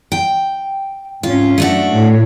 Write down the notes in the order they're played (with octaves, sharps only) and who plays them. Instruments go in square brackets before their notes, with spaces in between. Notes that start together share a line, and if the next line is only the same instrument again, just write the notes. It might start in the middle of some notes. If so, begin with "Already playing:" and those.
[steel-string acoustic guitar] G5
[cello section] G#2 C#4 [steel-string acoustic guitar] F4
[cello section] F#2 [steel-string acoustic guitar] A3 D4 F#4
[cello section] A2 C#5